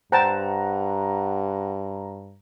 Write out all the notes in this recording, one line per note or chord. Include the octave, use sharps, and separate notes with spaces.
G2 C5 F#5 G5 A5 A#5